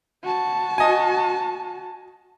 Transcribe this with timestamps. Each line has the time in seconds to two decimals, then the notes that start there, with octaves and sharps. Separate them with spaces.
0.23 F#4 A5
0.78 D#5 G#5